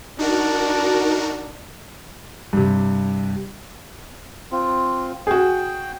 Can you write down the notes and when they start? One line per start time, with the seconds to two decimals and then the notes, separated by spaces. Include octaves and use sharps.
0.19 D4 D#4 F#4 A#4
2.53 G2 C3
4.52 C4 F4
5.27 F#4 G#4 G5